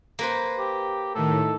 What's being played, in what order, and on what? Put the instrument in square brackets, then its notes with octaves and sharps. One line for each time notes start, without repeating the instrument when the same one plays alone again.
[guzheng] A#3 B4 C5
[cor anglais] G4
[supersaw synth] A2 D#3 [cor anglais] A4